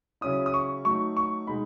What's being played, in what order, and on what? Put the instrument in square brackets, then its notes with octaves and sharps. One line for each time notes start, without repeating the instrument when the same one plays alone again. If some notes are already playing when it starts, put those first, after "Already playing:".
[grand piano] C#3 F#3 C#4 E4 D#6
D#6
C#6
F#3 A3 D#4 C#6
C#6
B2 G#3 D#4 B5